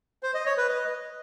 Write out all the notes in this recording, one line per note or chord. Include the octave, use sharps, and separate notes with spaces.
C5
D#5
C#5
B4
D#5